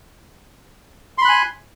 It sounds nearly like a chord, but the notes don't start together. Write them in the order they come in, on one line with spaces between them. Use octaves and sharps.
C6 B5 F#6 G#5